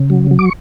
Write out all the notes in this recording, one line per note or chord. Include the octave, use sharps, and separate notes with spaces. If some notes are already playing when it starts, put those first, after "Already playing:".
Already playing: C#3
F#3
F#3
D6
C#6